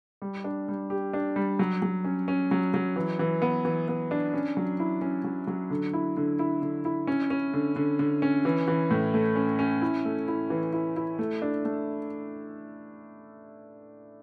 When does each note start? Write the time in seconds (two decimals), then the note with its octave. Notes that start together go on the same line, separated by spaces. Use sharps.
0.22 G3
0.44 D4
0.68 G3
0.90 G4
1.14 D4
1.36 G3
1.59 F#3
1.82 F#3
2.04 C#4
2.28 C#4
2.51 F#3
2.74 F#3
2.96 E3
3.19 E3
3.42 B3
3.65 E3
3.88 B3
4.11 D4
4.34 C#4
4.57 F#3
4.80 E4
5.01 C#4
5.24 F#3
5.47 F#3
5.70 D3
5.93 E4
6.17 D3
6.39 E4
6.62 D3
6.85 E4
7.07 C#4
7.30 C#4
7.53 D3
7.76 D3
7.99 D3
8.22 C#4
8.45 E3
8.68 E3
8.90 A2
9.14 A3
9.36 C#4
9.59 C#4
9.82 E4
10.05 A3
10.28 E4
10.50 E3
10.73 E4
10.96 E4
11.19 A3
11.42 D4
11.65 A3